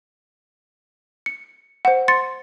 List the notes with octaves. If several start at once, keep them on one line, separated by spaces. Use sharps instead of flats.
C#7
C5 F#5
C6 A6 C#7